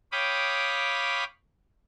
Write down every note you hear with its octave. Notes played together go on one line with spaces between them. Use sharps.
C#5 F5 G5 B5 D6 D#6